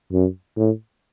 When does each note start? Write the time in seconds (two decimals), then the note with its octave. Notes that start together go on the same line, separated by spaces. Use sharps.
0.12 F#2
0.57 A2